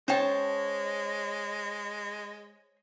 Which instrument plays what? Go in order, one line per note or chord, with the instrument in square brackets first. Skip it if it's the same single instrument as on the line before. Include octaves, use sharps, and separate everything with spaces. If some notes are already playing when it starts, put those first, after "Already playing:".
[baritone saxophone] G#3 [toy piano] C#4 G5 [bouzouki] C5 C#5 A5